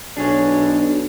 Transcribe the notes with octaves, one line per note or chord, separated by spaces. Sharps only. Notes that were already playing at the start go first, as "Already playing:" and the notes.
B1 D4 G#4 C#5